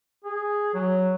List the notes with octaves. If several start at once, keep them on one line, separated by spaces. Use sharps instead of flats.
G#4
F#3